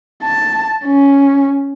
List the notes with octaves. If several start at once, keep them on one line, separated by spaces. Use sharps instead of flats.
A5
C#4